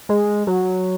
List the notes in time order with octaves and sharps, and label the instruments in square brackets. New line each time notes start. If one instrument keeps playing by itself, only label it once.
[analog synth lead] G#3
F#3